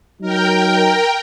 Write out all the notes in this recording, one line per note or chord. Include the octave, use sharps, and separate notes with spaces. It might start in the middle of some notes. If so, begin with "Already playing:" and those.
F#3 D#4 A#4 G5